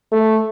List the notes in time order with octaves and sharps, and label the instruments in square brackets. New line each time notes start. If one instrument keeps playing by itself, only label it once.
[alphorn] A3